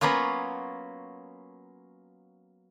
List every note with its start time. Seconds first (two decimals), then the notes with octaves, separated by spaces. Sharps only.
0.01 F#3 A#3 B3 C#4 F4